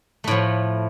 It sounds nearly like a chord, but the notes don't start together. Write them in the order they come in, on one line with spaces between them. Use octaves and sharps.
A3 A2 F3